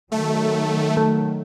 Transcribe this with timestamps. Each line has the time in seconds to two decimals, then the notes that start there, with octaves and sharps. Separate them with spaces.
0.12 D#3 F#3 A3
0.97 A3